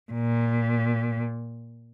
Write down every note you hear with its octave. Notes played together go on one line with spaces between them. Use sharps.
A#2